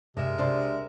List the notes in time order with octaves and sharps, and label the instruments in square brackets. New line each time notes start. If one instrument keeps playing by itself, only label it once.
[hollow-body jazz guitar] G2 [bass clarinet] C3 [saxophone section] G#3 A#4 E5
[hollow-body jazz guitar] C2 D4 C5 [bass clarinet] C3